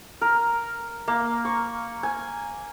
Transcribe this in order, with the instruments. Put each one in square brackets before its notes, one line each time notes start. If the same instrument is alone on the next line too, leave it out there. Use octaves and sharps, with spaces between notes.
[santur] A#4
A#3
C#6
G#5